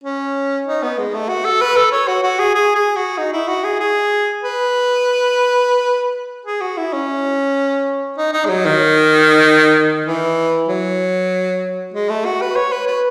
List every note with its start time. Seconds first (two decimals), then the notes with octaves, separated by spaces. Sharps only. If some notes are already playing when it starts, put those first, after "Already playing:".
0.04 C#4
0.67 D#4
0.82 B3
0.98 G#3
1.14 A3
1.29 F#4
1.45 A4
1.61 B4
1.76 A4
1.92 C#5
2.07 F#4
2.23 F#4
2.39 G#4
2.55 G#4
2.75 G#4
2.96 F#4
3.18 D#4
3.33 E4
3.48 F#4
3.64 G#4
3.80 G#4
4.43 B4
6.45 G#4
6.61 F#4
6.77 E4
6.93 C#4
8.18 D#4
8.33 D#4
8.45 G#3
8.49 F#3
8.65 D#3
10.06 E3
10.68 F#3
11.94 G#3
12.09 A3
12.25 F#4
12.41 B4
12.56 C#5
12.72 B4
12.87 B4